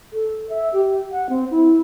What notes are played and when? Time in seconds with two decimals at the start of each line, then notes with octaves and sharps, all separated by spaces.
0.13 A4
0.49 E5
0.73 G4
1.11 F#5
1.29 C4
1.51 E4